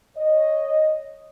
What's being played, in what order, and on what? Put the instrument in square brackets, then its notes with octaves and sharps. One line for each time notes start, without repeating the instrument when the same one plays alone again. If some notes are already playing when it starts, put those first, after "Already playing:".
[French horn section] C#5 D#5